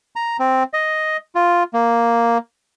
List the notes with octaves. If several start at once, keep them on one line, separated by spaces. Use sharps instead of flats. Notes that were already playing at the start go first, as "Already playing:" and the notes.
A#5
C4
D#5
F4
A#3